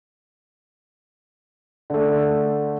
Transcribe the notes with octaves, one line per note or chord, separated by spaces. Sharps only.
D3 A3